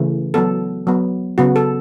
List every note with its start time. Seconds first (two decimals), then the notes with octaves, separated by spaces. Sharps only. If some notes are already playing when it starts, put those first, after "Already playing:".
Already playing: C#3 E3 A3
0.34 F#3 B3 A4
0.87 F#3 B3
1.38 C#3 F#3 B3 F#4
1.56 A4